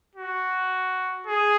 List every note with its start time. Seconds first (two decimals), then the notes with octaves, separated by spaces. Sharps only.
0.15 F#4
1.27 G#4